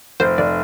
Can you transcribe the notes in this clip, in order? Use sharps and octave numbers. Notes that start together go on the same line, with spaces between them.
F1 C5
F1 D5